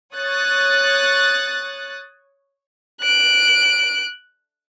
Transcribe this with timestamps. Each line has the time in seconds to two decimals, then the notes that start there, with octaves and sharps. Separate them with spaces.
0.14 C#5 D#6 F#6 A6
3.01 F#6 D7